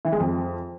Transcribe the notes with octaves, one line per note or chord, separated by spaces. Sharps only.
E3
G#3
F2